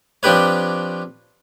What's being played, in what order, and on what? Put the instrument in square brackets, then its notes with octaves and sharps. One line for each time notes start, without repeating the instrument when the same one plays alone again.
[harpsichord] F3 C4 D4 G4 B4 C#5